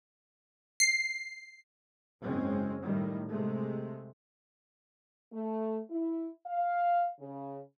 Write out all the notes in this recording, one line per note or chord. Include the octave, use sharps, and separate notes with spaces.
C7
F#1 G#2 G#3 C4 C#4
A2 D#3 G3
C3 G#3 A3
A3
E4
F5
C#3